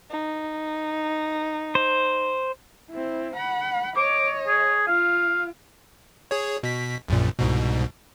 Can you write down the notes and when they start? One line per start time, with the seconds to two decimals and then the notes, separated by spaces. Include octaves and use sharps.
0.10 D#4
1.75 C5
2.90 C4 E4
3.36 F#5 B5
3.97 C#5 D#5 D6
4.48 G#4
4.87 F4 F5
6.31 G#4 C#5
6.63 B2 B6
7.08 A#1 F#2 A#2
7.39 C2 G#2 B2